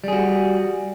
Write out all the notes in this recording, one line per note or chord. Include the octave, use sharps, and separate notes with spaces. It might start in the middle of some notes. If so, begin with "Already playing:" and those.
G3 F#4 G#4